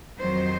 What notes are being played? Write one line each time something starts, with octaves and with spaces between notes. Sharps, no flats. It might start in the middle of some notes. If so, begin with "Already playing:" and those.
F2 D#3 F#3 C5